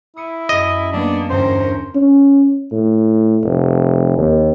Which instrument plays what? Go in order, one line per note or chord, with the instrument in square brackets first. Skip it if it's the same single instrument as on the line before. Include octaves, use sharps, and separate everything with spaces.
[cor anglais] E4 [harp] D#6 C#7 D#7
[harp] F#2 G#4 [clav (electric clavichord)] D#5
[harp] F#3 [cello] A#3 B3 [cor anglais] D4
[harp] E2 G2 D3 [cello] C#4 A#4 [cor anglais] C5
[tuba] C#4
A2
F1
D#2